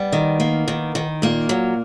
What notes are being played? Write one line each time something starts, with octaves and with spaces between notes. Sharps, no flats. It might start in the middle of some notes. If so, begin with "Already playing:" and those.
Already playing: G3 B3
D#3
A#3
D#3
D#3
A#2 A#3
F#3